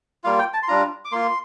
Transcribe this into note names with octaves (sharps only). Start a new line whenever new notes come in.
G3 A#3 F4 F5
G5
A5
C6
G3 D4 F4 A#5
D6
A#3 F4 C6